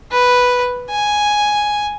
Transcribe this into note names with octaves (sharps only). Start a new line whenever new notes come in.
B4
G#5